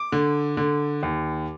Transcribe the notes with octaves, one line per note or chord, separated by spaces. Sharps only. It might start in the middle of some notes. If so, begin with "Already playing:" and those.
Already playing: D6
D3
D3
D#2